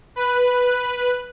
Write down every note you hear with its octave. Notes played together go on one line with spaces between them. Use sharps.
B4 F#6